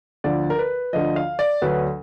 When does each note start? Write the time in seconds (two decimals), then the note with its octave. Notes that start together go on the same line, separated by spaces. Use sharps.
0.24 D2 D3 F3 D5
0.50 A#4
0.59 B4
0.93 D2 D3 F3 D#5
1.16 F5
1.39 D5
1.62 D2 D3 F#3 B4